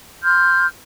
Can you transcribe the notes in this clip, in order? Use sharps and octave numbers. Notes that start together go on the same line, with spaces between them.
C6 F6 G6